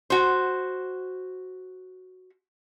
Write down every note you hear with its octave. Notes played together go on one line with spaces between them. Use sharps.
F#4 C5